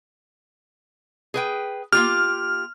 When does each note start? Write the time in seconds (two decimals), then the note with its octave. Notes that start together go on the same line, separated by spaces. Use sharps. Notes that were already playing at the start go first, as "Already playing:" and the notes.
1.34 G#4 B4 G5
1.92 A#3 F4 G4 F6